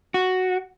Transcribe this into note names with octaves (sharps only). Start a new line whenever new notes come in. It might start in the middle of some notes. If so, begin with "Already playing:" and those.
F#4